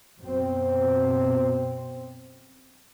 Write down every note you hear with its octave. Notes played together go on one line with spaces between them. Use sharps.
F#2 B2 C4